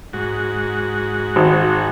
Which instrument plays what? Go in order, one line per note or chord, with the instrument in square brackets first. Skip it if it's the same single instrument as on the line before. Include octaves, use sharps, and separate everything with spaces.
[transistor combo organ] G#2 F#4
[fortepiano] G#1